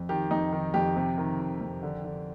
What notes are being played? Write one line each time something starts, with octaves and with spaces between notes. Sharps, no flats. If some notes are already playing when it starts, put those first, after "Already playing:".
Already playing: F2
D#3 G4
F2 D#4
D#3
F2 G4
C3
D#3
D#3
F2
D3
D3